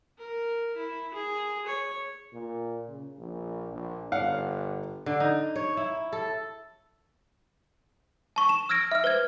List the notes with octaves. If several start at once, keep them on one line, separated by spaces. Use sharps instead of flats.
A#4
E4
G#4
C#5
A#2
C#3
A#1
A#1
G1 F5 F#5
D3
D#4
C#5
E4
A4
A5 C#6
E7
E6 F6 G#6 A#6 D7
E5 F6
B4 C5 F6 G#6